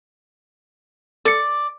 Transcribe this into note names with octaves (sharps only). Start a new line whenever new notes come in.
A4 D5 C#7